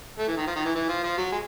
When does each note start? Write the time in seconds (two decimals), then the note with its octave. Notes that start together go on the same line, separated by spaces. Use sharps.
0.18 A3
0.28 E3
0.37 D#3
0.47 F3
0.56 D#3
0.65 E3
0.75 E3
0.89 F3
1.03 F3
1.18 F#3
1.32 G#3